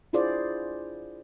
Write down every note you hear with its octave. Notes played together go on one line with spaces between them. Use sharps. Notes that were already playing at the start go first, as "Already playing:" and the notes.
D4 E4 F4 G#4 C5 D5